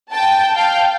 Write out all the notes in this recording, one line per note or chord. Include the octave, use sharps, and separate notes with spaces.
G5 A5
F5 G5